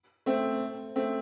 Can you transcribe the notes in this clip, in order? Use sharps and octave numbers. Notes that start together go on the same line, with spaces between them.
A3 C4
A3 C4